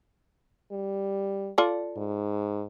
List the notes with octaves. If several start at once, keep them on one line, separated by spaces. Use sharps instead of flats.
G3
F4 A4 D5
G#2